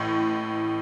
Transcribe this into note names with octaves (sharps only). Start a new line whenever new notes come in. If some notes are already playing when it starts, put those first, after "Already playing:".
Already playing: A1 A2 C#6